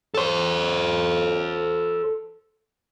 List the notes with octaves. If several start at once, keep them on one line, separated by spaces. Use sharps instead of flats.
A4 C5